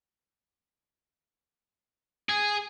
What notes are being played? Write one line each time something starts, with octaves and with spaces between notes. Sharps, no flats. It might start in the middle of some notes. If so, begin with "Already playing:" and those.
G#4